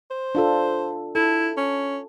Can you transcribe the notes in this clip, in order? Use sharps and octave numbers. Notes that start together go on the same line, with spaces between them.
C5
D4 F4 A4
E4 A4
C#4